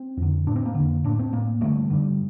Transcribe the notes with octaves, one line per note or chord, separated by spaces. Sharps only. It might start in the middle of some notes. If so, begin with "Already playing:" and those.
Already playing: C4
F2 D3
A2 D4
C4
A#3
F2 D3
A2 D4
C4
A2 A#3
G2 D3 A3
G2 D3